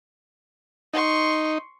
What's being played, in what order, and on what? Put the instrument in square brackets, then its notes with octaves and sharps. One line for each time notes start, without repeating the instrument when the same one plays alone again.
[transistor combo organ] D#4 [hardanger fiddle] C6 C#6